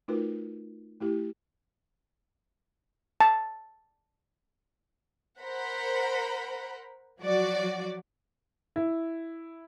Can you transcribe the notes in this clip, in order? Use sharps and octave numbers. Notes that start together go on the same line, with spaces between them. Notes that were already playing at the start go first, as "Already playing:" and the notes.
A3 D#4 F4 F#4 A#4 B4
A3 E4 G4
A5
A#4 C5 F#5 A#5 B5
F3 F#3 F#4 D5
E4